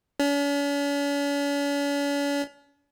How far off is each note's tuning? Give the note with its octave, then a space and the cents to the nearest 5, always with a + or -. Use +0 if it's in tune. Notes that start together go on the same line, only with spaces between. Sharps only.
C#4 +45